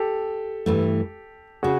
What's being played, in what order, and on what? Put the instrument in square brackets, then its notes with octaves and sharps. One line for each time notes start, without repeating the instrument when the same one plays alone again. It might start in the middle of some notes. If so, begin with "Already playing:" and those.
Already playing: [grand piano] G4 A4
[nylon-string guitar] G2 E3 A3
[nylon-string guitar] C#3 [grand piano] F#4 G#4